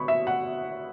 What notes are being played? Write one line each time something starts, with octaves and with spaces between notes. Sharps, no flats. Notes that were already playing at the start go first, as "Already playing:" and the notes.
Already playing: B2 B5 C#6
E5
F#5